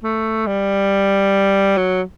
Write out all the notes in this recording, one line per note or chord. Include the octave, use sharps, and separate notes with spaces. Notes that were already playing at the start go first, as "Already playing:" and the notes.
A3
G3
F#3